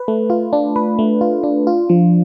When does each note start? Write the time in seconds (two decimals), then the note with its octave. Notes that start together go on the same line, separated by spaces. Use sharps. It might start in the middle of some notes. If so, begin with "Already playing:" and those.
Already playing: B4
0.08 A3
0.30 F4
0.53 D4
0.76 B4
0.99 A3
1.21 F4
1.43 D4
1.67 F4
1.90 F3